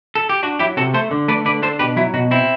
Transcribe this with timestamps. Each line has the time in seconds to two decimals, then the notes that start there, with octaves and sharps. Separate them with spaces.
0.15 A4
0.29 G4
0.43 D4 F#4
0.59 F#3 E4 G4
0.77 C3 F#4 A4
0.94 A3 A4 C5
1.11 D3
1.28 A3 B4 D5
1.45 D3 B4 D5
1.62 D4 A4 C5
1.79 B2 G4 B4
1.96 F#3 E4
2.14 B2 F#4
2.31 C4 E4